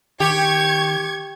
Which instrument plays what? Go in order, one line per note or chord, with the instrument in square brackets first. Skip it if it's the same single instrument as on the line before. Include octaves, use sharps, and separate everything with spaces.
[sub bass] D#3 [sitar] G4 [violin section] C#6 G#6